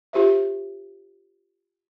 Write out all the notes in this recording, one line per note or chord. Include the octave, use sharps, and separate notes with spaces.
F4 G4 C5 E5